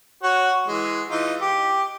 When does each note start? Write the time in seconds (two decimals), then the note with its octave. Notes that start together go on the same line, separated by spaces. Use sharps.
0.23 F#4 C#5
0.67 E3 G#3
1.10 E3 D#4 F4
1.41 G4